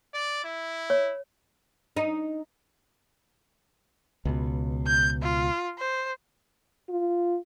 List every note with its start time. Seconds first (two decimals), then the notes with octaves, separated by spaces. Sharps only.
0.14 D5
0.44 E4
0.90 C#5
1.97 D#4
4.25 C#2 B2
4.87 G6
5.22 F4
5.78 C5
6.89 F4